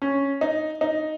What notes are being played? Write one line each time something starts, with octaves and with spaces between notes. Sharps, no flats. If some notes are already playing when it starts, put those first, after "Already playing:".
C#4
D#4
D#4